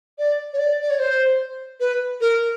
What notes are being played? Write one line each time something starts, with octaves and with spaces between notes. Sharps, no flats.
D5
C#5
D5
D5
C#5
C5
B4
A#4